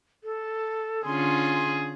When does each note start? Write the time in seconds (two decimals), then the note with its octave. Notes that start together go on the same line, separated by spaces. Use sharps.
0.24 A4
1.05 D3 C#4 F4 G#4 C6